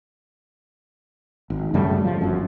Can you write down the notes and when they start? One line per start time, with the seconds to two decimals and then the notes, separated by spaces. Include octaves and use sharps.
1.50 G#1
1.74 F#2 C#3 G3 A3
2.05 F3
2.21 G1 F#2